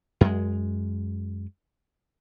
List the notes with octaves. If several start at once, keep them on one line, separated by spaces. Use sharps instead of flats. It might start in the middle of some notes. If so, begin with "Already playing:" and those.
F#2 G#3